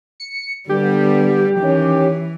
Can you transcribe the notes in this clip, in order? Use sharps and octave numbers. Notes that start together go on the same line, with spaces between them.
C#7
D3 G3 B3 G4
D#3 E3 C#4 C#5